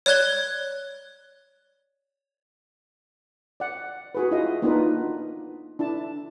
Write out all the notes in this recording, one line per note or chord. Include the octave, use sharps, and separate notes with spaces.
C#5 D5 F#6 G#6 G7
D5 F#5
F#4 G#4 B4
E4 F4 G#4 D#5 F5
A#3 B3 D4 D#4 F4 B4
D4 E4 A5